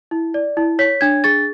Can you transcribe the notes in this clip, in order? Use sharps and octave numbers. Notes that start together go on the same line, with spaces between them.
E4
D5
E4
C#5 B6
D4 G#6
G#4 A6